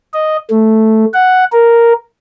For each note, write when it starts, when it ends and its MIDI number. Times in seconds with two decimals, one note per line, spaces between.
0.13 0.37 75
0.50 1.05 57
1.14 1.44 78
1.52 1.93 70